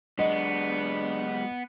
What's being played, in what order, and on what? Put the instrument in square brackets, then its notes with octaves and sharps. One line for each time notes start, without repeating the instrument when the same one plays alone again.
[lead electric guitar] F#3 G#3 [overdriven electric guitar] B3 [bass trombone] D4 [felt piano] D#5